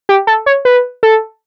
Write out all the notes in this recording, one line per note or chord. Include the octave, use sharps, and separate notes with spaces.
G4
A4
C#5
B4
A4